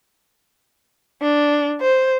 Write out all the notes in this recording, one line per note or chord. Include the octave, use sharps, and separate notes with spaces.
D4
C5